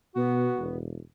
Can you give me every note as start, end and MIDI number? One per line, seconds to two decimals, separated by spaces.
0.16 0.49 47
0.16 0.77 59
0.16 0.75 66
0.57 0.99 28